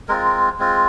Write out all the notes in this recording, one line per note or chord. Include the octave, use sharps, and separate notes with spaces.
G#3 C4 F4 A#4
G#3 C4 F4